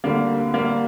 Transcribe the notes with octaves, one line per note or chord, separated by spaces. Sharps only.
D2 D3 G3 A#3
G3 A#3